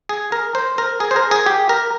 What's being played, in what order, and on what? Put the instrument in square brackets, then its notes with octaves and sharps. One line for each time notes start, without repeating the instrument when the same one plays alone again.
[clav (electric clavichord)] G#4
A#4
C5
A#4
G#4
C5
A#4
G#4
G4
A#4